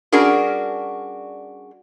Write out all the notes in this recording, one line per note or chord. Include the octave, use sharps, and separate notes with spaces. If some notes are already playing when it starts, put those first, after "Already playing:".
G3 C#4 D4 F#4 G#4 A#4